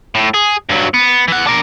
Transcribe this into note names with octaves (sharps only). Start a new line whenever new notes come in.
A2
G#4
G2 F#3
B3
E3 F#5
D4 A#4